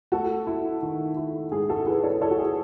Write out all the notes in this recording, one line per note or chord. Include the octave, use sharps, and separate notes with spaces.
A3 F#4 A4
E4
D#3
E4
G#2 G#4
F#4 A4
E4 G#4 B4
A4 C#5
E4 A4 C#5
F#4
G#4